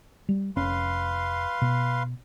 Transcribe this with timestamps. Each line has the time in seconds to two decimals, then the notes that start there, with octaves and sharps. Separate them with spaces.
0.29 G3
0.56 F1 C#4 B4 F5 C6
1.62 B2